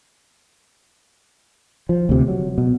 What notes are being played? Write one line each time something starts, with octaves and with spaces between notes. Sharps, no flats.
F3
D2 C3
F#3
B2